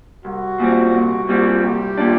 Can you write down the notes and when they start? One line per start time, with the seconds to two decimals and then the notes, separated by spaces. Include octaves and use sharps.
0.25 C2 F#4
0.60 A#2 G3 C4
0.94 C2
1.29 A#2 G3 C4
1.63 C2 G4
1.98 A#2 G3 D4